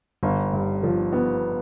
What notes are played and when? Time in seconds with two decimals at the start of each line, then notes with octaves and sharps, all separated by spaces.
0.23 G1
0.53 G2
0.83 F3
1.12 B3